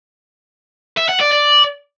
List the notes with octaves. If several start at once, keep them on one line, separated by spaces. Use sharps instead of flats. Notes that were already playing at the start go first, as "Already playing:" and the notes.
E5
F#5
D5
D5